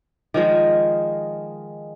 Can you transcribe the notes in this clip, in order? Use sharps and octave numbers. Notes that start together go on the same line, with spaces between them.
D#3 F3 G#3